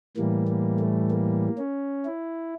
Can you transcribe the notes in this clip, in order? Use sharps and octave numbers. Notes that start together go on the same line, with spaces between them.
A2 E3 G3 A#3
A#3
A3
A#3
C#4
E4